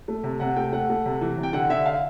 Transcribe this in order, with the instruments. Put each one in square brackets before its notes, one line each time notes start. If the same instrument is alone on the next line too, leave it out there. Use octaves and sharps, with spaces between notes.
[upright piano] A3
C3
C3 F#5
A3 G5
A3 F#5
A3
C3
E3
C3
G5
D3 F#5
D3 E5
F5